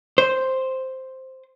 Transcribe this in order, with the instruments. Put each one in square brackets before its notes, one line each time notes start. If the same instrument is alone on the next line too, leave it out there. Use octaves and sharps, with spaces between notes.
[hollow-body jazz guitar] C5